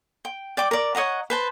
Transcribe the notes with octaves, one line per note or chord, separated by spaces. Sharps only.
G5
D5 G5 D6
A#4 D5
C#5 D#5 F#5 A#5
B4 C5 A5